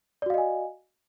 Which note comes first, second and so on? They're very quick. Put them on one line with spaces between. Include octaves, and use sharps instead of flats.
D5 F#4 F5 D#5 G#5